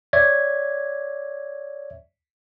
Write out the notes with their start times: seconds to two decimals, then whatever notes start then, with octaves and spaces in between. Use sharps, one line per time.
0.13 C#5 D5 E5 G#6